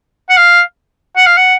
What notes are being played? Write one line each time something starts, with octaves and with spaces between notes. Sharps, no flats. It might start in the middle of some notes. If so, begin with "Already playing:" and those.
F#5
F5
F#5
F5
F#5